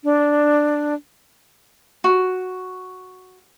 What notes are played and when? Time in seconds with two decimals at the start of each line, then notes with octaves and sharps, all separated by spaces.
0.04 D4
2.04 F#4